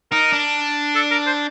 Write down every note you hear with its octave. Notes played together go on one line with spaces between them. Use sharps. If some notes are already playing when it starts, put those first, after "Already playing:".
D#4 A#4
D4
A4
A#4
C5